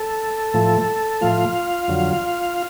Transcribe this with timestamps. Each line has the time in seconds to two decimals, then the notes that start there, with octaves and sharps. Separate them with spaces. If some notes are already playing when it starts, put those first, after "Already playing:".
Already playing: A4
0.54 A2 F3 A3
1.21 A2 F3 A3 F4 F5
1.88 F2 D3 F#3